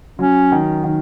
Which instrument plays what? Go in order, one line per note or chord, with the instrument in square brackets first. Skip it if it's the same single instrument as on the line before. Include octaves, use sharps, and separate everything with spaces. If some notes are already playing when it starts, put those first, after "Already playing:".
[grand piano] F#3 [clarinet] C#4
[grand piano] D#3
D#3